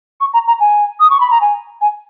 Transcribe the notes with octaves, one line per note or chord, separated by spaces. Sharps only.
C#6
A#5
A#5
G#5
D#6
C#6
B5
A#5
G#5
G#5